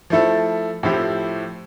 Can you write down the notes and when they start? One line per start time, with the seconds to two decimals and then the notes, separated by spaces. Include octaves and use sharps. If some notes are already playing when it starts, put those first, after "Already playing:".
0.10 F3 A3 E4 A4
0.83 A2 F3 C4 E4 G4